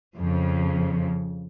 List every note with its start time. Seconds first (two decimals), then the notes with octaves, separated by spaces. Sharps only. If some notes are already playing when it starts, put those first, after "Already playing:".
0.17 F2 C#3 F3